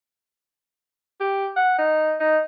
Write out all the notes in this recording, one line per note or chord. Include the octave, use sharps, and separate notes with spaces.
G4
F#5
D#4
D#4